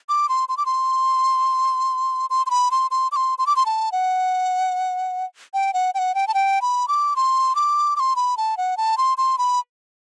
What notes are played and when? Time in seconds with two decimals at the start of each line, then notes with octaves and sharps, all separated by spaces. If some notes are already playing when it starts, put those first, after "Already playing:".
0.09 D6
0.29 C6
0.49 C6
0.57 D6
0.66 C6
2.30 C6
2.46 C6
2.50 B5
2.71 C6
2.91 C6
3.12 D6
3.16 C6
3.39 C6
3.47 D6
3.56 C6
3.66 A5
3.92 F#5
5.54 G5
5.74 F#5
5.94 G5
5.99 F#5
6.15 G5
6.27 A5
6.34 G5
6.62 B5
6.88 D6
7.16 C6
7.55 D6
7.96 D6
8.00 C6
8.16 B5
8.37 A5
8.57 F#5
8.77 A5
8.98 C6
9.18 C6
9.38 B5